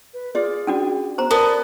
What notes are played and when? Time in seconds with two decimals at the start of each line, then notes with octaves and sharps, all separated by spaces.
0.14 B4
0.35 F4 G#4 D5
0.67 C#4 D4 F#4
1.18 B3 C5 A#5
1.31 B3 A#4 D5 A5